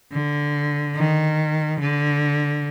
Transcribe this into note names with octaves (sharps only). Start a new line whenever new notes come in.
D3
D#3
D3